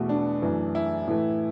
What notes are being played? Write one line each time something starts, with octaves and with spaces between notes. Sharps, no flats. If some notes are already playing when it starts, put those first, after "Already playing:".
Already playing: E2 B2 A3 F#4
D4
F#2 E3 A3
E4
A2 E3 A3